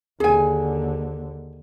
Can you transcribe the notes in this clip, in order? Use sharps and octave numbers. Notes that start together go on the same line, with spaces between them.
D#2 D3 G#4 G#5